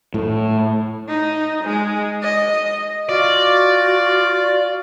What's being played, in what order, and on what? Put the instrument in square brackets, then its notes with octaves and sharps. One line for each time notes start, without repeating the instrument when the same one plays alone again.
[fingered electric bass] A2
[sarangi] D#4
G#3
D#5
[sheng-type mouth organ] F4 [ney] F#4 [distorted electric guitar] D5